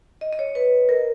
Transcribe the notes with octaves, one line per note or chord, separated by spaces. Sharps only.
D#5
D#5
C#5
B4
A#4